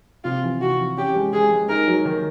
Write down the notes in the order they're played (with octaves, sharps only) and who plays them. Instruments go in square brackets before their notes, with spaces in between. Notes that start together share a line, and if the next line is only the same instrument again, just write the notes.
[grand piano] C3 [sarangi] F4
[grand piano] E3
[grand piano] C3 [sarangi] F#4
[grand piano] E3
[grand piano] C#4 [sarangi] G4
[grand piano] G#3
[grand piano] G#3 [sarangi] G#4
[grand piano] G#3
[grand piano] D#4 [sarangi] A#4
[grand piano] F#3
D#3